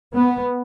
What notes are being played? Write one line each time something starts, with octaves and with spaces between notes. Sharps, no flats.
B3